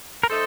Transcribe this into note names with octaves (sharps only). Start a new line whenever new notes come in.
A#4
A3 D#4 A4 C5